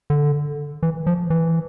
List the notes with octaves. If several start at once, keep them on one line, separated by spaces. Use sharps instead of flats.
D3
E3
F3
E3